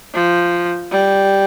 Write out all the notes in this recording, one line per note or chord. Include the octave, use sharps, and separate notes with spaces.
F3
G3